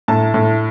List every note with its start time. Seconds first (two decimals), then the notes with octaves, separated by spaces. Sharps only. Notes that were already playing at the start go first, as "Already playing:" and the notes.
0.08 A2 A5
0.34 A2